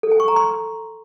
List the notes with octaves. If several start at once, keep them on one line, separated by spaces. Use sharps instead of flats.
A4
G#5
C#6
A#5
C6